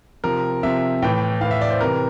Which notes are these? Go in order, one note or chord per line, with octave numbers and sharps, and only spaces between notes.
C3 F3 A#4
C3 F3 E5
A2 E3 G5
A2 E3 F5
E5
D5
C5
C3 E3 A#4